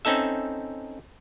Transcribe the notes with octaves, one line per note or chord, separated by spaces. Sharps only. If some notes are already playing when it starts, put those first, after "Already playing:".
C4 C#4 D#4 A4 E5